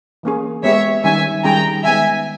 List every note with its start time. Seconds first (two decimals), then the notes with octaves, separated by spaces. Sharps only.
0.23 E3 A#3 C#4 G#4
0.63 G#3 B3 G4 C#5 E5
1.04 D#3 G3 C#4 E5 G#5
1.44 D#3 G3 C#4 G#4 G5 A#5
1.84 D#3 G#3 B3 E5 G#5